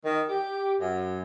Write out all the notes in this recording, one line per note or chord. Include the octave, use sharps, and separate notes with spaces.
D#3
G4
F#2